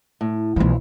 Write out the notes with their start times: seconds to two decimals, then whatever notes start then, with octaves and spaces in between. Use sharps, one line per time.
0.21 A2
0.56 B1 F2 E3 E4 F4